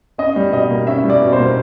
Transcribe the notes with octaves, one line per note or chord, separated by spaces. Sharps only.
C#4 D#5
G3
B2 D#5
A#3
C#4 E5
G3
D5
B2
C5
A#3